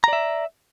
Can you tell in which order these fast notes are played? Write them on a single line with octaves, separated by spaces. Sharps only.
A#5 D5 E5